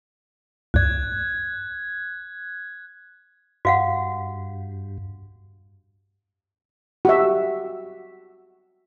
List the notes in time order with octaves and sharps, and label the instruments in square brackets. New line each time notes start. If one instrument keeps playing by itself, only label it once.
[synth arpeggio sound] C#2 G2 D5 [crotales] F#6 G#6
[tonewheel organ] G2 [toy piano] F#4 F5 F#5
[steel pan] F#4 G4 E5